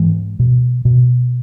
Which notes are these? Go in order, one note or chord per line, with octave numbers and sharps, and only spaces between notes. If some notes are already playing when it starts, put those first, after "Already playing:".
Already playing: G#2 E3 G#3
B2
B2